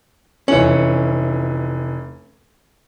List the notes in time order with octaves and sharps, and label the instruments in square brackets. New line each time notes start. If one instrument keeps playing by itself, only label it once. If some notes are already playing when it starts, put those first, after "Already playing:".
[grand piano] F1 E3 F#7 [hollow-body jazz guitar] C#4